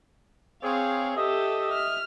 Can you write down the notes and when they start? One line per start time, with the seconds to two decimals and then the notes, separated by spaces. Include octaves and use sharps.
0.64 C4 G#4 C#5 F5
1.17 G4 A4 D#5 E5
1.73 F6